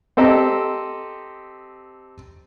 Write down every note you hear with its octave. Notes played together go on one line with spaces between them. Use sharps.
C4 G4 A4 D#5 A#5